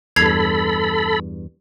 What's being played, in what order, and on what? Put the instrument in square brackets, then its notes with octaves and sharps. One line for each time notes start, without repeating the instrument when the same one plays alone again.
[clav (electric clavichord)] E2 G2 [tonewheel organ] A4 B5 [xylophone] G#6 C7 F7